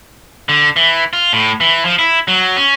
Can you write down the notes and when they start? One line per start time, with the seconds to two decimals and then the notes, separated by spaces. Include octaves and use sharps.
0.49 D3
0.76 E3
1.13 F4
1.33 A2
1.61 E3
1.85 F3
1.99 E4
2.28 F#3
2.57 C#4